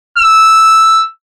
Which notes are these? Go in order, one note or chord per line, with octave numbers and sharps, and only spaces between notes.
E6